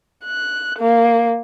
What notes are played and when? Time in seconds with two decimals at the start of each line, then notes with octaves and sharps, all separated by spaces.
0.25 F#6
0.79 A#3